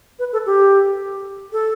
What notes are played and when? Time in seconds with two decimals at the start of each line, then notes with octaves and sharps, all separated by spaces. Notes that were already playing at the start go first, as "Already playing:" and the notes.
0.19 B4
0.33 A4
0.46 G4
1.53 A4